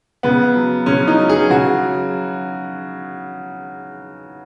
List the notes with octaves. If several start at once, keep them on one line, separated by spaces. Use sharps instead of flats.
C#3 B3
F#3
C#3 C#4
D#4
F#3
G#4
C#3 F#4
F#3